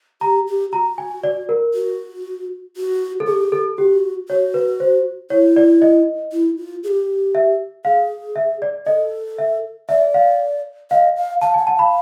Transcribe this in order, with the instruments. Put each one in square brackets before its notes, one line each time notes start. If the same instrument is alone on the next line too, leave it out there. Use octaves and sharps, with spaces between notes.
[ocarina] G4 [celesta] A#5
[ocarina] G4
[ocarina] F#4 [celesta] A#5
[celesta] G#5
D5
A#4
[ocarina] F#4
F#4
[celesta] A4
[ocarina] G4 [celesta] G#4
[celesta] A4
[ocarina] F#4 [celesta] G4
[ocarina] F#4 [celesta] C#5
[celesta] B4
C5
[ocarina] E4 [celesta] C#5
[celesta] D5
D#5
[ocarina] E4
F4
G#4
G4
[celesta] E5
[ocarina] G#4 [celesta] F5
[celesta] E5
D5
[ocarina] A4 [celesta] D#5
[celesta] E5
[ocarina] D5 [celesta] E5
[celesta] F5
[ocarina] D#5 [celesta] F5
[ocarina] F5
[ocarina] F5 [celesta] A5
[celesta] G#5
[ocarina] F#5
[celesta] A5
[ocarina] F5 [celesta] B5